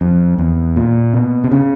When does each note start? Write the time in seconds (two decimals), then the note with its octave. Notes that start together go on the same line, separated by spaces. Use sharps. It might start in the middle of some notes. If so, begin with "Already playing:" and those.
0.01 F2
0.38 E2
0.76 A#2
1.14 B2
1.44 C3
1.52 C#3